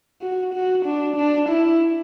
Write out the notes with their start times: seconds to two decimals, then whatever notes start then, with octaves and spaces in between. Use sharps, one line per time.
0.22 F#4
0.54 F#4
0.86 D4
1.16 D4
1.49 E4